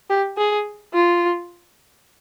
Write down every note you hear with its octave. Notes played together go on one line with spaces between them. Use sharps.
G4
G#4
F4